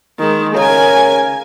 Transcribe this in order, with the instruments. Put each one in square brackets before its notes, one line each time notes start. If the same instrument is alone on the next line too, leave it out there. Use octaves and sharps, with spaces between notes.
[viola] D#3 G#3
[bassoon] C#3 [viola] A#4 G#5